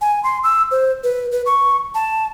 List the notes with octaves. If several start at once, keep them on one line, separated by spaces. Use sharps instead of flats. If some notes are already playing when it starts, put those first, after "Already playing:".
G#5
C6
E6
C5
B4
B4
C#6
A5